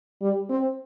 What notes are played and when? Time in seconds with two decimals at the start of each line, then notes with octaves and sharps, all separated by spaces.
0.22 G3
0.50 C4